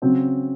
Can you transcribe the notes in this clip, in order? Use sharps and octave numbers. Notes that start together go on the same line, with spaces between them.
C#3 F#3 C4